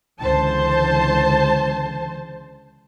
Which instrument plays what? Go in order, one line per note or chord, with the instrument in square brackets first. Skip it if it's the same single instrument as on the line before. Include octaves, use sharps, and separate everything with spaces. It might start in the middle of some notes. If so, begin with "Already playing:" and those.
[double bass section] C#2 D3 E3 [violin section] C5 A5